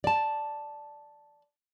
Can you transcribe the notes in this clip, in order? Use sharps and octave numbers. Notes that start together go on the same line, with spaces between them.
D5 A5